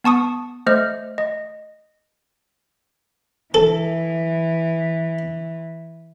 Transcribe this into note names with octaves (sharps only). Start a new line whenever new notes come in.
B3 A5 C#6 D#6
A3 C5 D#5 F6
D#5
E3 A4